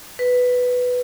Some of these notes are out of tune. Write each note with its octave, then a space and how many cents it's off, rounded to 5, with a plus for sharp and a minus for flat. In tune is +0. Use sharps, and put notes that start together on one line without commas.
B4 +5